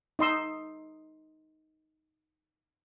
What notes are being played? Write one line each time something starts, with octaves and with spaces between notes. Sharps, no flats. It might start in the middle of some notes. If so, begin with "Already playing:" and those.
D#4 D#5 C6 E6